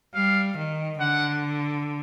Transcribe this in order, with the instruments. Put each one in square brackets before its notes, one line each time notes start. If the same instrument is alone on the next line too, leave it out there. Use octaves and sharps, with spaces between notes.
[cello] G3 [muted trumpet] F5
[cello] D#3
[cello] D3 [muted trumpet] F#5